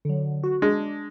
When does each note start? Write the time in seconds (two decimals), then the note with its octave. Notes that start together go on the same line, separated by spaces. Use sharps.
0.05 D3 F#3
0.43 F#4
0.62 G#3 D4